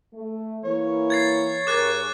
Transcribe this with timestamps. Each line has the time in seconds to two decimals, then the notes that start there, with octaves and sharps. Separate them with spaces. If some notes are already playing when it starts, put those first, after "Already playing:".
0.13 A3
0.64 E3 A#3 C#5
1.10 G#6 A6 C7
1.67 G2 G#4 A#4 D6 F#6 A6